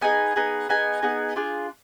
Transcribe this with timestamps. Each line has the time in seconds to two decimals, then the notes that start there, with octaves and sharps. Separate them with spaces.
0.01 B3 D#4 G#4 G#5
0.36 B3 D#4 G#4
0.69 B3 D#4 G#4 G#5
1.02 B3 D#4 G#4
1.36 D4 F4 G#4